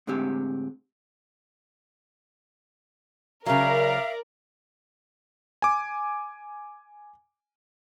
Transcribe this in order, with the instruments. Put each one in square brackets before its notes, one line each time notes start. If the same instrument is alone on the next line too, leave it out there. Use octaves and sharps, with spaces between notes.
[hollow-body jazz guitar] A2 D3 G#3 C4 G4
[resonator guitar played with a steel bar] C#3 F#3 [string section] A#4 D5 [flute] E5 [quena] F5
[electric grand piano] G#5 D6